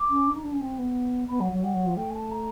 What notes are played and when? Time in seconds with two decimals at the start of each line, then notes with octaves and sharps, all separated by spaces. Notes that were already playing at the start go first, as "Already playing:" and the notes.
Already playing: D6
0.10 C#4
0.27 D4
0.35 D#4
0.44 D4
0.53 C#4
0.61 C4
0.78 B3
1.29 B3 B5
1.40 F#3 F#5
1.52 F#3
1.63 G3 F#5
1.74 F#3
1.85 F3
1.96 A3 G5
2.10 G#5
2.14 A5
2.31 A#5